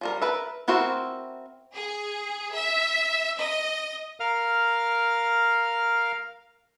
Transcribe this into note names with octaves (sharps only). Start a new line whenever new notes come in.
F3 G3 A#4
A#4 B4 E5
C4 E4 F#4 A#4 C5
G#4
E5
D#5
A#4 F5 F6